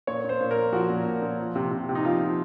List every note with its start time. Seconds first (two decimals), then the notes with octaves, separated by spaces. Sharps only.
0.07 A#2 C#5
0.24 A#2 C5
0.40 A#2
0.51 A#4
0.56 A#2
0.72 F3 F#4
0.90 A#2
1.05 A#2
1.22 A#2
1.39 F3
1.56 C3
1.71 C3
1.89 C3
1.95 D#4
2.05 F3 F4
2.21 F3